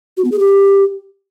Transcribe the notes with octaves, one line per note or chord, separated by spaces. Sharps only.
F#4
B3
G#4
G4